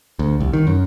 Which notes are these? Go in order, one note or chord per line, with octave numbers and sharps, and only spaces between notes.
D2
C2
D#3
F#2